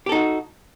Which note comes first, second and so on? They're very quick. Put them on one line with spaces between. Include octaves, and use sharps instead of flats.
G4 A4 D#4 F#4